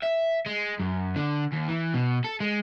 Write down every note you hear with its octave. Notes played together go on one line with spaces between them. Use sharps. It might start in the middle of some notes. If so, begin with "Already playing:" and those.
E5
G#3
F#2
D3
D#2
E3
B2
A4
G#3